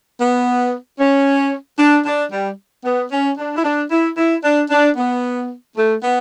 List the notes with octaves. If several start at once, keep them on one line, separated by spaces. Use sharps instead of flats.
B3
C#4
D4
D4
G3
B3
C#4
D4
E4
D4
E4
E4
D4
D4
B3
A3
B3